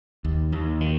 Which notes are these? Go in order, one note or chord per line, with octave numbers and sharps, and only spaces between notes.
D#2
D#2
D#3